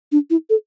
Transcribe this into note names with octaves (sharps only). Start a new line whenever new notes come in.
D4
E4
A4